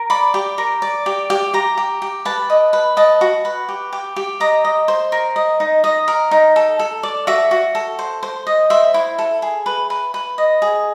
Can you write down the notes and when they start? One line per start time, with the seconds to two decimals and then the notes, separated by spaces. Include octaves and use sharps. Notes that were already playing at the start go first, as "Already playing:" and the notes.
Already playing: A#4
0.10 D5 B5
0.34 G4
0.58 A#4
0.82 D5
1.06 G4
1.30 G4
1.54 G4 A#5
1.78 G4
2.02 G4
2.25 B4 A5
2.50 D#5
2.73 B4
2.97 D#5 A5
3.21 F#4
3.45 B4
3.69 G4
3.93 G4
4.16 G4
4.40 D#5 A#5
4.65 D#5
4.88 C5
5.12 A#4
5.36 D#5
5.60 D#4
5.84 D#5
6.08 A#4
6.31 D#4
6.56 A4
6.79 A4
7.03 D5
7.27 F#4 E5
7.51 F#4
7.75 A4
7.99 C5
8.23 C5
8.47 D#5
8.70 C5 E5
8.94 E4
9.19 A4
9.42 G#4
9.66 B4
9.90 B4
10.14 B4
10.38 D#5
10.62 G#4